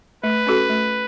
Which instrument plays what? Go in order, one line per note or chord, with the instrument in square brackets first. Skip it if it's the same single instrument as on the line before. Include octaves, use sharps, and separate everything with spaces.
[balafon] A3 [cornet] B4
[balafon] C#4 F#4 A4
A3